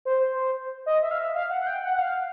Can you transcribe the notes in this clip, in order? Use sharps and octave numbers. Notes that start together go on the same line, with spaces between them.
C5
D#5
E5
F5
E5
F5
F#5
F#5
G5
F#5
F#5
F5